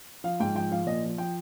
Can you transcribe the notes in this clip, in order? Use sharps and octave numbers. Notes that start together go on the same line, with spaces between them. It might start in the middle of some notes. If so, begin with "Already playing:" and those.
F3 F5
G#2 G5
F3 G5
F3 F5
A#2 D#5
F3
F3 G5